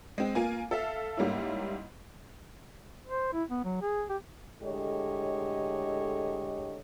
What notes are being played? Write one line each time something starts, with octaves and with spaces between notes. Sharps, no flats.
G#3 C4
A#3 F4 G#5
A4 E5 F5
G#2 G3 A#3 C#4 E4
C5
E4
B3
F#3
G#4
G4
A2 D3 G#3 G4 C#5 D#5